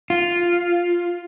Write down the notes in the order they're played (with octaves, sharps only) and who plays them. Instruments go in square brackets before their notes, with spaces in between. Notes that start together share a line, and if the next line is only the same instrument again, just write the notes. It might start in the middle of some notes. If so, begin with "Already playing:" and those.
[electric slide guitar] F4